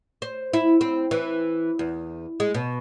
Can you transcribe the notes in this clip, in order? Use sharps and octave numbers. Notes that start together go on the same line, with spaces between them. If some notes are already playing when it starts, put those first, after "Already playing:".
C5
E4
C4
E3
E2
G#3
B2